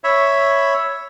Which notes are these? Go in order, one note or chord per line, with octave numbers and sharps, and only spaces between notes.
C#5 E5 B5